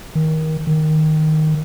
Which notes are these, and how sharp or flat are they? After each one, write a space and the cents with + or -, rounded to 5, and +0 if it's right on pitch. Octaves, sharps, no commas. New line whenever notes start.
D#3 +20
D#3 +0